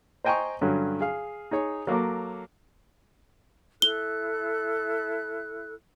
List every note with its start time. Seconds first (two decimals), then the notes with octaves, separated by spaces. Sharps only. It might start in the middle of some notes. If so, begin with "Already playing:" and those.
0.24 C5 D#5 G5 G#5 A#5 C#6
0.61 G2 D3 F#3 C#4
1.01 G#4 F5
1.51 D#4 G#4 C#5
1.87 F#3 A#3 A4 C#5 D6
3.82 E4 A4 F#6 G7